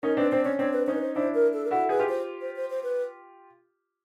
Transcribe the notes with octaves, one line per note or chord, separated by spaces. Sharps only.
C#4 D#4 A#4
C4 D4 B4
C4 D4 C5
C#4 C#5
C4 D4 C#5
B4
C#4 D#4 C5
B4
C5
D4 E4 C5
A#4
A4
A#4
E4 F#4 A4
G#4 B4
F4 G4
C5
C5
C5
C5
B4